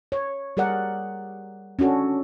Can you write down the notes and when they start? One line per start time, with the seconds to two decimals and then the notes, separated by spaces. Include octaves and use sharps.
0.12 C#5
0.57 G3 G#4 A#4 D5 F#5
1.79 C#4 D4 F#4 A4